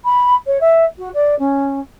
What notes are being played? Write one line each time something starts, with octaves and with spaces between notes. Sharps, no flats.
B5
C#5
E5
F#4
D5
C#4